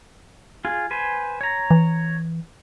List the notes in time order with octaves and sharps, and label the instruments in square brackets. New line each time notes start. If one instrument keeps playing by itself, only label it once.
[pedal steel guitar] F4 G#4
B4 C5 G#5
C#5 A#5
[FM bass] E3